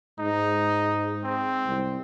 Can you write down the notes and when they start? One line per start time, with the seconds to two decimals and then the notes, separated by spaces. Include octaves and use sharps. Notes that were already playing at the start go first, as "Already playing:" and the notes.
0.19 G#2 D#4
1.24 C4
1.67 C2